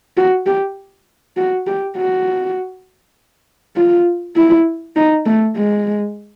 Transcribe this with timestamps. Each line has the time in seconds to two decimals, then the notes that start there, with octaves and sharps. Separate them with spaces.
0.17 F#4
0.46 G4
1.37 F#4
1.67 G4
1.97 F#4
3.76 F4
4.36 E4
4.96 D#4
5.26 A3
5.57 G#3